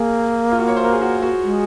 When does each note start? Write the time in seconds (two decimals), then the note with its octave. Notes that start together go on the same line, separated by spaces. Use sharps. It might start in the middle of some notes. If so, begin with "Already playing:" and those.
Already playing: A#3 G#4
0.52 F4
0.59 F#4
0.68 C#5
0.76 C5
0.84 A#4
0.93 G#4
1.02 F#4
1.22 F#4
1.44 G#3